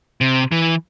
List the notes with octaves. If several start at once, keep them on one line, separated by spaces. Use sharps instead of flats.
C3
E3